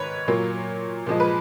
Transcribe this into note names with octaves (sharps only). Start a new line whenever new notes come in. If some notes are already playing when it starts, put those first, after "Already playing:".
Already playing: G#2 D#3 B4 C#5
A#2 F#3 A#3
A#2 F3 G#3
B4